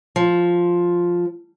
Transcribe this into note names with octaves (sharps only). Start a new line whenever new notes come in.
F3